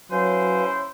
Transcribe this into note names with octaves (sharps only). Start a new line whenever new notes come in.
F#3 C#4 E4 B4 C5 F5 G#5